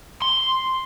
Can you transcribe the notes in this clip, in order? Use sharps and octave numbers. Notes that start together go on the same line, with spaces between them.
C6